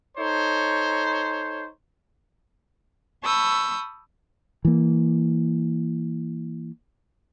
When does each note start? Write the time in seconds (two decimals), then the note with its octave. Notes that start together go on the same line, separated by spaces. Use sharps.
0.16 D#4 A4 C5 C#5
3.24 A5 B5 C#6 D#6 E6 G6
4.65 E3 A#3